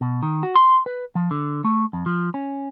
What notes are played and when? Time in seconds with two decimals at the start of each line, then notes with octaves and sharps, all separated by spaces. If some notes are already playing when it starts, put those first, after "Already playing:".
0.01 B2
0.23 D#3
0.43 F#4
0.55 C6
0.86 B4
1.15 F3
1.31 D3
1.64 A3
1.93 F2
2.06 F3
2.34 C#4